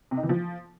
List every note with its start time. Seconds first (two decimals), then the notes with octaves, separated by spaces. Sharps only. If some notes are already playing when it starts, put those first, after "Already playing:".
0.11 C3
0.17 D#4
0.23 E3
0.29 F3